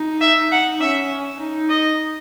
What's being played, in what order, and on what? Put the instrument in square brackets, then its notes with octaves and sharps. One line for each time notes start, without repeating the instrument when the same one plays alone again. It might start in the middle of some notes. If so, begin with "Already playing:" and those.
Already playing: [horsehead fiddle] D#4
[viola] E5
[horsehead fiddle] D#4 [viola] F#5
[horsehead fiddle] C#4 [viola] E5
[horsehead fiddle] D#4
[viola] D#5